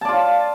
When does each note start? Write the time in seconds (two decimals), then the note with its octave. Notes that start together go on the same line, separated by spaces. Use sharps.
0.01 A5
0.05 D5
0.09 F4